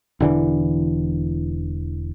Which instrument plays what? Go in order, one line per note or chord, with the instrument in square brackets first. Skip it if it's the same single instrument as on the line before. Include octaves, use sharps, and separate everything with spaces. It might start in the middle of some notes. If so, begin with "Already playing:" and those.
[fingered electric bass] E1 D3 E3